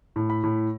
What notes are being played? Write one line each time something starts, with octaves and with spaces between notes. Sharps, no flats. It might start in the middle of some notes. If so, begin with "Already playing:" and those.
A2
B5
A2